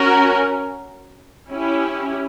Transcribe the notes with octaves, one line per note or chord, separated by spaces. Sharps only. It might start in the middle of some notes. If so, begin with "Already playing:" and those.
Already playing: C#4 F#4 A#4
C#4 E4 G4